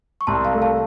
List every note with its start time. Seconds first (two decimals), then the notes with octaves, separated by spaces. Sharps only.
0.21 C#6
0.27 C2 A5 C6
0.45 F5 A5
0.53 A3
0.62 F5 A5